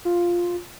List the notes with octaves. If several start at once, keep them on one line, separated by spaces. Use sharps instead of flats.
F4